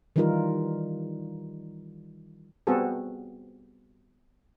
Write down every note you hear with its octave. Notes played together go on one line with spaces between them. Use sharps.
D#3 E3 G3 D#4 F4 A#4
G3 B3 C4 F#4 G#4 A4